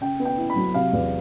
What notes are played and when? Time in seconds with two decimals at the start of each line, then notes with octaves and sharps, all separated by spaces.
0.01 C#3 G5
0.19 B3
0.25 G5
0.38 E4
0.50 B5
0.56 F#3
0.74 C3 F5
0.93 E2